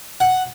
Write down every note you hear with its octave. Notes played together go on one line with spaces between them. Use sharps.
F#5